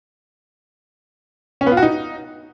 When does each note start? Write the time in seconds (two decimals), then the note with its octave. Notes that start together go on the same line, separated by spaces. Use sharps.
1.61 C#4
1.66 B3
1.72 F4
1.77 F#4
1.83 D#4